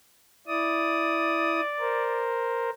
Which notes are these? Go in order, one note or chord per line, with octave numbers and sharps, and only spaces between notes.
E4 D5 D#6
A#4 C5